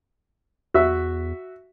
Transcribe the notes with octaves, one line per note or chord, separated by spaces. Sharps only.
E2 F#4 E5